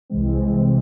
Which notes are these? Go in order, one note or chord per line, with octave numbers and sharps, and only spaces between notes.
C2 C3 E3 G#3 C4